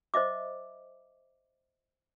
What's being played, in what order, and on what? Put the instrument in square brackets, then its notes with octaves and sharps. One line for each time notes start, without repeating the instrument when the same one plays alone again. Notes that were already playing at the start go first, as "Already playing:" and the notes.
[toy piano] C5 D#5 E5 D6